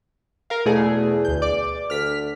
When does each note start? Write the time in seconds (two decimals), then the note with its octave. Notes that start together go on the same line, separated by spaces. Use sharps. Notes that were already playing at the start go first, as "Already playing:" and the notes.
0.50 A#4 F5
0.66 E2 B2 A3 G#4
1.25 D2 G6
1.42 D5 D6
1.90 D2 F6 B6